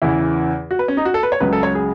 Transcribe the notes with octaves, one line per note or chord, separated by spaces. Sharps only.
E2 C#3 E3 E4
F#4
B4
C#4
D#4
F#4
A4
B4
C#5
C#2 C#3 F#3 B4
A4
C#5
G#4